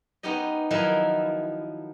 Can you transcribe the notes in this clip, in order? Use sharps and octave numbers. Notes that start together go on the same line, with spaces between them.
B3 C#4 D#4 G4 D#5
D#3 F3 F#3 D#4 E4